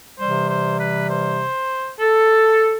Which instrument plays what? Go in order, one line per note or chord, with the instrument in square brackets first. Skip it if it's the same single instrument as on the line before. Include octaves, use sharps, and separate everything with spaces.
[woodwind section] C3 E3 G3 C5
C5
B4
C5
A4